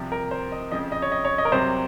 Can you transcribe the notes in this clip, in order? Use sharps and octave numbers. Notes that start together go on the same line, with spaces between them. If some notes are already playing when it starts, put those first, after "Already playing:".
Already playing: C2 C3 F3
A#4
C5
D#5
F2 C#3 F3 D#5
D#5
C#5
D#5
C#5
D#5
A#4
C2 C3 F#3 C5